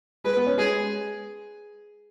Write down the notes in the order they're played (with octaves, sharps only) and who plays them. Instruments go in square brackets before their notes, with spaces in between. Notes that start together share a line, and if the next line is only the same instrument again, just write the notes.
[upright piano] G#3 [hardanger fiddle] B4
[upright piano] B3
C#4
[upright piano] G#3 [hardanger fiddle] G#4